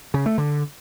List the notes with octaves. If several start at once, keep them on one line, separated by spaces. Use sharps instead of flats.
C#3
A3
D3